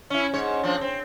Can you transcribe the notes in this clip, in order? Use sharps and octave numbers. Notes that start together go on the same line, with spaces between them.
C#4 E4
G#2 C#5
F3 C4 D4
C4